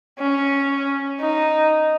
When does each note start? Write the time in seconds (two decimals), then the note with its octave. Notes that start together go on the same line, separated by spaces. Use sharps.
0.19 C#4
1.21 D#4